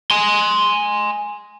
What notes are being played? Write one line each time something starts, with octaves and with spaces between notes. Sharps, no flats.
G#5 C6